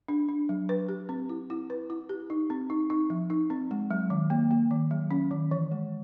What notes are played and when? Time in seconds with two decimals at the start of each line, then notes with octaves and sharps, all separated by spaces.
0.08 D4
0.29 D4
0.49 F#3
0.69 B4
0.89 G4
1.09 C4
1.29 E4
1.50 E4
1.70 B4
1.90 E4
2.09 G4
2.30 D#4
2.50 C4
2.70 D#4
2.90 D#4
3.10 F3
3.30 D#4
3.50 C4
3.71 G#3
3.91 F#3
4.10 D#3
4.30 A#3
4.51 A#3
4.71 D#3
4.91 F#3
5.11 C#4
5.31 D#3
5.51 E3
5.71 G#3